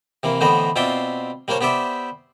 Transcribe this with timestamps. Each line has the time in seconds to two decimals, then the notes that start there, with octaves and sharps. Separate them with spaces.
0.23 C3 E3 A#3
0.41 A2 D3 E3 B3 C5 D#5
0.76 B2 C4 F4 D5 E5 C6
1.48 G3 A#3 D4 C5 C#5
1.61 B3 G4 C5 D5 E5